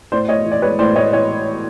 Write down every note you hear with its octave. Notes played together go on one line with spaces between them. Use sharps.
A2 C5 D5
A2 C#5 D#5
E3
D5
G#3 B4 C#5
A2 C5 D5
A2 C#5 D#5
E3 C#5 D#5